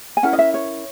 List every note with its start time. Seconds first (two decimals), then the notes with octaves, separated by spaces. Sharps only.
0.17 G#5
0.23 C#4 E4 A#4 F#5
0.33 D#5
0.39 E5
0.54 C#5